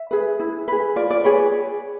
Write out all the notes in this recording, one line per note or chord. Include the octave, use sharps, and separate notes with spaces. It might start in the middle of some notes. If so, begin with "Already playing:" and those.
Already playing: E5
G#4 B4
E4
G#4 B4
F4 D5
D5
G#4 B4 C#5